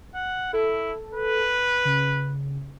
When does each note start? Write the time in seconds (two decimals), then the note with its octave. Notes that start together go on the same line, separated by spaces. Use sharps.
0.15 F#5
0.53 E4 A4
1.15 B4
1.85 C#3